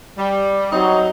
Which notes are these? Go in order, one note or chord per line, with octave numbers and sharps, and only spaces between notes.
G3
F#3 C4 D#4